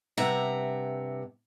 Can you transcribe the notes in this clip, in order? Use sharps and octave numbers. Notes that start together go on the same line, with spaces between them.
G2 C3 E5 F#5 A#5